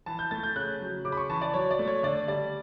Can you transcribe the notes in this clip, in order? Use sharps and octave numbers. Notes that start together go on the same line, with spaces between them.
E3 A5
G6
A3 A6
G6
C#3 F#6
F#3
C#3 D6
B5
C#6
E3 A5
D5
F#3 C#5
D5
A3
C#5
D3 D5
G3 D5